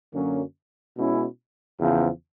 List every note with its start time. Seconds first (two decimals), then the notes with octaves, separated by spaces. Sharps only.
0.13 F#2 D3 F#3 A#3 C#4
0.96 B2 G#3 C#4 E4
1.79 E2 C#3 F3